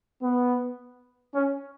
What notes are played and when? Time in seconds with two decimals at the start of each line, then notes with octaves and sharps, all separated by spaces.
0.23 B3
1.35 C#4